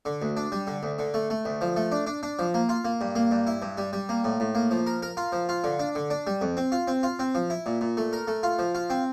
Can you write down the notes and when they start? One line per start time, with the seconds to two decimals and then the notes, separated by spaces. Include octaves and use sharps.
0.05 D3
0.22 D2
0.37 D4
0.52 G3
0.67 D3
0.83 D2
0.99 D3
1.14 A3
1.30 A3
1.45 D2
1.61 F3
1.76 A3
1.92 D4
2.07 D4
2.23 D4
2.39 F3
2.54 A#3
2.69 F4
2.85 A#3
3.01 G2
3.15 A#3
3.31 G2
3.47 E4
3.62 G2
3.78 G3
3.93 G3
4.09 A#3
4.24 A2
4.40 A2
4.55 A#3
4.71 F3
4.87 A#4
5.02 A#4
5.17 F4
5.32 F3
5.49 F4
5.64 D3
5.79 D4
5.95 D3
6.10 D4
6.27 G3
6.41 F2
6.57 C4
6.72 F4
6.88 C4
7.03 F4
7.19 C4
7.35 F3
7.50 E4
7.66 A#2
7.81 A#2
7.97 A3
8.13 A#4
8.28 A3
8.43 F4
8.59 F3
8.75 F4
8.90 C4